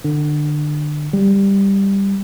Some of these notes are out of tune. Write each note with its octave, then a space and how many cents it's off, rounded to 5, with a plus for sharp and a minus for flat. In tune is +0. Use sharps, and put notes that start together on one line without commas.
D3 +25
G3 +10